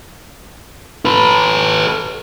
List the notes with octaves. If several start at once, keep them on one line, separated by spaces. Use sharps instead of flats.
A4 B4